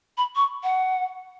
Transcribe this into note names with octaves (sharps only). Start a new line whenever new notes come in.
B5
C#6
F#5